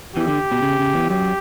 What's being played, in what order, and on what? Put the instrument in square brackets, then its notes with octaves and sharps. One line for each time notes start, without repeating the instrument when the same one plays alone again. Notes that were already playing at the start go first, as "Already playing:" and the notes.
[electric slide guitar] E2 E3 [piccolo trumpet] G4
[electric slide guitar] D3
B2
C#3
C#3
E2 E3
[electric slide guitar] F#2 F#3 [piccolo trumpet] G4